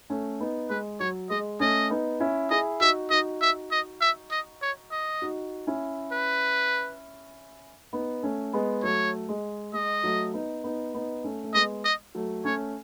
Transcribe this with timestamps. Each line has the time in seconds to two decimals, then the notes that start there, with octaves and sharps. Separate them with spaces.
0.10 A3 C#4
0.40 B3 D#4
0.70 G#3 B4
1.00 F#3 C#5
1.30 G#3 D#5
1.60 A3 C#4 D#5
1.90 B3 D#4
2.20 C#4 E4
2.51 E4 G#4 D#5
2.80 D#4 F#4 E5
3.10 D#4 F#4 D#5
3.41 E5
3.71 D#5
4.01 E5
4.31 D#5
4.62 C#5
4.91 D#5
5.22 D#4 F#4
5.67 C#4 E4
6.12 B4
7.93 B3 D#4
8.23 A3 C#4
8.53 G#3 B3
8.83 F#3 A3 C#5
9.28 G#3
9.73 G#3 D#5
10.03 F#3 A3
10.33 B3 D#4
10.64 B3 D#4
10.94 B3 D#4
11.24 A3 C#4
11.43 A3
11.54 G#3 B3 D#5
11.84 D#5
12.15 F#3 A3
12.44 A3 C#4 C#5